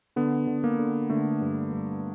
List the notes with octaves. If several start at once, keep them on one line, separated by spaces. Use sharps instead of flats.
D3 B3
D3
A#3
D3
D3 A3
G2
G2